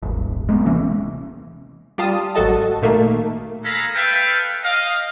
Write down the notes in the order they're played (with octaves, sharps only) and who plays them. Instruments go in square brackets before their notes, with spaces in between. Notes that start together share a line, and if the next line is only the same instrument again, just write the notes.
[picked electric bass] D#1 G#1
G#3 A#3 B3
D1 C3 E3 C#4
[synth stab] G3 F4 A5 D#6
G#1 F#3 F#4 A4 D#5 A5
A#2 D#3 A3 A#3
[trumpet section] G#3 G#4 A4 F5 A#5 B5
A4 B4 E5 F5 G5
D#5 F5